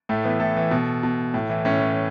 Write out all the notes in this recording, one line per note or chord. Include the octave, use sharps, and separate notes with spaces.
A2 A3
E3 B3
A2 A4
E3
B2
B2
A2
E3
A2 C#4
E3